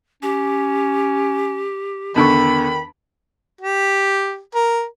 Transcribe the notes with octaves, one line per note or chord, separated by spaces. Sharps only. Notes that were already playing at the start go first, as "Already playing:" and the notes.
C#4 G4
E2 D3 D#3 B5 C#6
G4
A#4